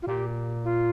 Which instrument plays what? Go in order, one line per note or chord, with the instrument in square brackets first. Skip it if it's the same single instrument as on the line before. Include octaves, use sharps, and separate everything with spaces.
[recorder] F4
[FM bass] A#2 [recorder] G4
[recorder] F4